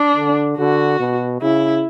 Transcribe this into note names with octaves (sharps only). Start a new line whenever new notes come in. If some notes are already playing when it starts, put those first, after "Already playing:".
Already playing: D4
D3
D3 F#4
B2
C#3 E4